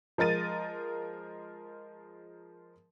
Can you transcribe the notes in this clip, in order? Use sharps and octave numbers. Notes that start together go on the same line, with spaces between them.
F3 G#3 A#4 A6 D#7